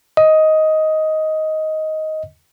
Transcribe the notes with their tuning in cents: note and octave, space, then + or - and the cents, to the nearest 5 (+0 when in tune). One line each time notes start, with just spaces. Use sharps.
D#5 +10